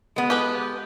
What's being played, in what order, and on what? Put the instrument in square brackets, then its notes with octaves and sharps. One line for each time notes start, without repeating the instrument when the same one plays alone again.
[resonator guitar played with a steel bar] G#3 B3
[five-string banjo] G4 A4 B4